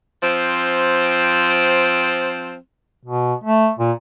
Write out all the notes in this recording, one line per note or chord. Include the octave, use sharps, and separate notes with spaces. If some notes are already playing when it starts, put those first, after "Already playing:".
F3 C4
B2
A3
A#2